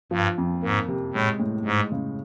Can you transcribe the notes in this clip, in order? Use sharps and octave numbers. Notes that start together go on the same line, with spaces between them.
G2 F3
F2
G#2 A#3
C3
A2 G#3
A2
G#2 G#3
C#3